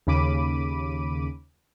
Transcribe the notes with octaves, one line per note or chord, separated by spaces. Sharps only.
D#2 C#3 B5 D6 D#7